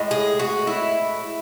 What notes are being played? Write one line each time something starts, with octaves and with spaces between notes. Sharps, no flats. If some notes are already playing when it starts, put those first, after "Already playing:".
Already playing: A2 G#3
G#4
F#4
E4